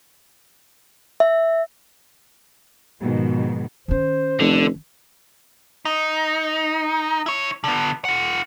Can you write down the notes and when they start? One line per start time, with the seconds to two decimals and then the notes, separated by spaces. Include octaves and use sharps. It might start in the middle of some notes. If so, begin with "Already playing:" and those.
1.20 E5
3.00 G#2 B2 D#3 F3
3.88 D#3 C#4 C5
4.40 F1 D3
5.85 D#4
7.26 E4 C#5
7.64 D3 B3
8.05 F4 F#5